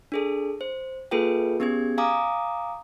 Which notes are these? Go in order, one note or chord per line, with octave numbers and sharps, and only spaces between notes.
D4 G#4 A4
C5
A#3 F4 G#4 A4 B4 G5
B3 C#4 G4 G#4 G#6
F5 G#5 A#5 D6 D#6